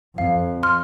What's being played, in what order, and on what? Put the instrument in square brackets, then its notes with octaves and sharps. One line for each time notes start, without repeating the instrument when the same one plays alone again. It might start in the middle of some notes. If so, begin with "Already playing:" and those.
[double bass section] F2 [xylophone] F5
[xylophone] C6 F6